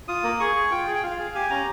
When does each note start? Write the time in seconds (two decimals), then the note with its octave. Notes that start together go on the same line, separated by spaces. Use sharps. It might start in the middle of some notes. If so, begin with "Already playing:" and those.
0.08 F4 D#6
0.24 A#3
0.40 G#4 C#6
0.55 G#4
0.71 F4 G5
0.87 G#4
0.95 G5
1.03 F4 F5
1.19 G#4
1.35 G4 G#5
1.50 C#4 A#5